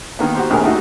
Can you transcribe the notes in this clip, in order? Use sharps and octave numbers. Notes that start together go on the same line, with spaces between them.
D#3 A#3 B3
F#4 G4 C5
A#1 D#2 A2 C3 G#4 A#4
G3 A3 A#3 D#4 F#4